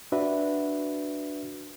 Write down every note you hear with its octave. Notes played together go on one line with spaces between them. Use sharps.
D4 F#4 B4 E5